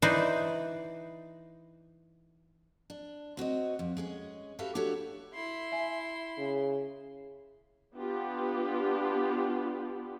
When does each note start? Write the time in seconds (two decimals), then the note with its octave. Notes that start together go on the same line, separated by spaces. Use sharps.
0.02 E3 D#4 B4 C5 D5
2.90 D4
3.37 C4 F#4 C#5 D#5
3.79 F2
3.97 G#3 C#4 G#4
4.59 F#4 G4 A4 B4 E5 F5
4.75 D4 F#4 G4 A4 C#5
5.34 E4 C6
5.72 E5 G#5
6.38 C#3
7.96 B3 D4 F4 G4